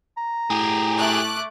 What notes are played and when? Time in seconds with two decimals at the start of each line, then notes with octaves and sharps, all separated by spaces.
0.17 A#5
0.50 A2 G4 G#4
0.96 A3 D6 F#6